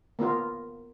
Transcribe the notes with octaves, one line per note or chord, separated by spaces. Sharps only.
A#3 B3 F4 A#4